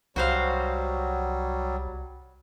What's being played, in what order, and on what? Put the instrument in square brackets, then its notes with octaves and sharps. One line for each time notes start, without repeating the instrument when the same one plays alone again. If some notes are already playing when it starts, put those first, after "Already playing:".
[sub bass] C2 [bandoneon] F#3 G3 [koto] F#4 C5 F5